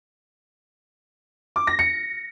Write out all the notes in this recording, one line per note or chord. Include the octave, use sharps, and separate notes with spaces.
D6
A#6
C#7